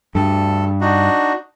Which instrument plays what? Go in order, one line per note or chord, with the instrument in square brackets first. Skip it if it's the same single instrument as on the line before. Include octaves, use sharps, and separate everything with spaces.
[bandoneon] D2 A4 [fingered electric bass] G2
[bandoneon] D4 D#4 F#4